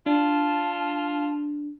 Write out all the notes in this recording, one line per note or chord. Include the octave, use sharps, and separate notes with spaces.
D4 F4 A5